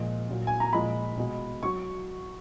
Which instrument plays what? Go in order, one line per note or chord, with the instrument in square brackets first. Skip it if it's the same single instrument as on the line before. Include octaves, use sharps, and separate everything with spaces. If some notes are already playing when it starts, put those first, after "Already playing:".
Already playing: [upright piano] A#2 F3 G#3
A#2 F#3
G#5
A#5
A#2 F3 G#3 B5
B2 G#3
F#3 C#6